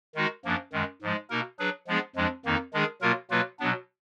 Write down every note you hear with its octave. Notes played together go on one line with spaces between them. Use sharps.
D#3 G#3 D#4 F#4
F#2 F3 A#3 D4
F#2 D#3 G#3
G#2 F3 G#3
B2 A#3 D#4 A#4
F#3 D4 G#4 B4
F3 G#3 B3 D4 G#4
F2 F3 G#3 D4
F2 D#3 A#3 D#4
D#3 G#3 D4 G#4
B2 F#3 A#3 F4 A#4
B2 F#3 A#3 F4 B4
B2 F#3 B3 D4